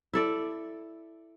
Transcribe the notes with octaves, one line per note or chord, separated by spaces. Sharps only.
E4 A4 D5